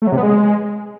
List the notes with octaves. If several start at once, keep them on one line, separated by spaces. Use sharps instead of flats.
A3
F#3
C3
B3
G#3